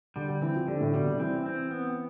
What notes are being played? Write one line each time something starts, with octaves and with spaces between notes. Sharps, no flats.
D3 G3
D3
E3 C4
F3
D3 G3
A2
B2 G3
C3
E3 C4
C4
B3